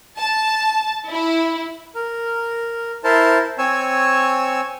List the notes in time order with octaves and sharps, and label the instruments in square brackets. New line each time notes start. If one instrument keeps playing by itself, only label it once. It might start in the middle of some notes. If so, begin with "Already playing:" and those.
[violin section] A5
E4
[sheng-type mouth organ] A#4
E4 A#4 C5 A5
C4 C#5 G#5 E6